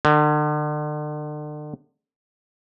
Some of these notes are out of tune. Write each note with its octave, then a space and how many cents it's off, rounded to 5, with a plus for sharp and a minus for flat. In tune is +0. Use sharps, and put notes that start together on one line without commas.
D3 +40